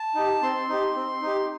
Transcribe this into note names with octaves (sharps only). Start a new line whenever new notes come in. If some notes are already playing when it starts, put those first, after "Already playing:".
Already playing: A5
D#4 G4
C4 C6
D#4 G4
C4
D#4 G4